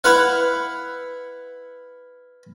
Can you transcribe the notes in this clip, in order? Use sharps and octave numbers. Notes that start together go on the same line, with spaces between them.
E4 B4 F5 F#5